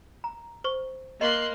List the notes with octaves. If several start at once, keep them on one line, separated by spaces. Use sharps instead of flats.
A#5
C5 C#6
A#3 D#5 C6 F#6